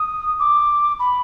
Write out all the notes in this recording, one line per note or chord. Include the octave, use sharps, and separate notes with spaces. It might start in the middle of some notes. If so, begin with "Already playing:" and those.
Already playing: D#6
D6
B5